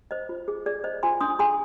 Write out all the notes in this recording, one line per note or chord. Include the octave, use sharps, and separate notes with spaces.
C5 D#5
F4
G#4
G#4 D5
C5 D#5
F4 G#5 C6
D4 C6 D#6
G#4 G#5 C6